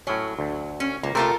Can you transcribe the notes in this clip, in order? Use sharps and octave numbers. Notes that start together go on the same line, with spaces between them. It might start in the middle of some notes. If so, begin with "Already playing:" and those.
A2 F#3 C#4
D2
C#4
C#2 A#3
C3 A3 F4 A4 A#4